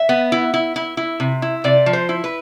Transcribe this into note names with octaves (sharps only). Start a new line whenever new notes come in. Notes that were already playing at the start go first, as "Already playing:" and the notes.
Already playing: E5
B3
E4
E4
E4
E4
C3
E4
C3 D5
F3
C5
E4
B4